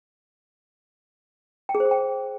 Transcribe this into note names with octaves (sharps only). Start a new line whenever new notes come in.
G5
G#4
C5
G#4
G5